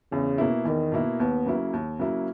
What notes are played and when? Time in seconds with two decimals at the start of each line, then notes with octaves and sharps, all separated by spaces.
0.12 E2 C#3
0.38 B2 A#3 E4
0.65 E2 D#3
0.92 B2 A#3 E4
1.19 D#2 B3
1.46 C#3 F#3 A#3 E4
1.73 D#2
1.99 C#3 F#3 A#3 E4